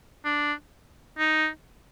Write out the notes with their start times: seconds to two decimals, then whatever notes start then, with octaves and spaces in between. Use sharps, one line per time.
0.25 D4
1.19 D#4